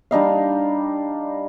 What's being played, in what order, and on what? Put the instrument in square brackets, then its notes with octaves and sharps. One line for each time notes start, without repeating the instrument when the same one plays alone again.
[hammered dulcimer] G3 D4 D#4 F5